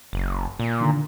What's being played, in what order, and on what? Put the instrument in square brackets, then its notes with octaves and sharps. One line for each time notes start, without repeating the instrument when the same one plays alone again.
[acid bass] F#1
A#2
[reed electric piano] D3 D#3